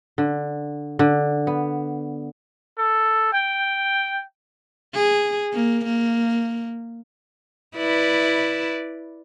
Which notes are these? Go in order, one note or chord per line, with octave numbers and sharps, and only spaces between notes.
D3
D3
B3
A4
G5
G#4
A#3
A#3
E4 B4 D5